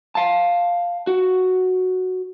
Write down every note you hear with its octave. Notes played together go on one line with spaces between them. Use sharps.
F5 A5
F#4